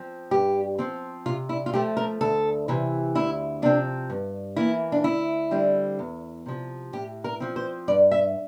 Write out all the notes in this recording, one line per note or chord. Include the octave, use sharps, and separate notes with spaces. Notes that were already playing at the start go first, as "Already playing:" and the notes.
Already playing: F3 C4
G2 G4
F3 C4
C3 F4
E4
F4
F3 A3 G4
A#4
D2 A4
C3 E3
D2 E4
C3 F3 C4 D4
G2
E3 A#3 E4
D4
D2 E4
D3 G3 C4
E2
C3 F3
A2 G4
A#4
F3 C4
C5
G2 D5
E5